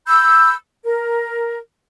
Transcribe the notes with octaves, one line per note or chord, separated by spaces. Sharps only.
B5 E6 G6
A#4